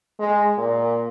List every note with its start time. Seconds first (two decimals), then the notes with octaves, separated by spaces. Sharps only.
0.19 G#3
0.58 A#2